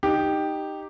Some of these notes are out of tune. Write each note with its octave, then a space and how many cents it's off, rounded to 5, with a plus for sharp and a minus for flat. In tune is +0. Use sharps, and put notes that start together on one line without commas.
D#4 -10 G4 +0